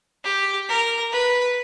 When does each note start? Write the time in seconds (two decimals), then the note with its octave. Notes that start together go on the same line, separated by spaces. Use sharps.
0.25 G4
0.69 A#4
1.13 B4